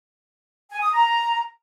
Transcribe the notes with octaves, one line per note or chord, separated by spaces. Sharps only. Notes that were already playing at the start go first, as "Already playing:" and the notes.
G#5
D#6
A#5